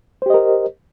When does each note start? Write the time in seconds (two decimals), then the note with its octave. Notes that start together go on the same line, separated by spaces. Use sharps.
0.22 C5
0.26 G4
0.30 D#5
0.34 A#4